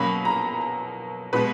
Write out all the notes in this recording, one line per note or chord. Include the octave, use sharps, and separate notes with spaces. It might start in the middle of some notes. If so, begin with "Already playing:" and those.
Already playing: B2 F#3 A#3 C#4 B5
A#5
B2 G#3 B3 B4